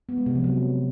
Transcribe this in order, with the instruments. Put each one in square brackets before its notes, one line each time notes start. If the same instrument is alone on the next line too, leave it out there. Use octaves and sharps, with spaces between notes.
[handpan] B3
G#3
C3
F3
F#3